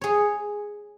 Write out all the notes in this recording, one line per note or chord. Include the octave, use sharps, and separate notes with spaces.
G#4 C#5